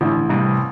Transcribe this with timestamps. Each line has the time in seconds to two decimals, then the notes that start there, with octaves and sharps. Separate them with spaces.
0.01 A1 D3
0.29 G2 C3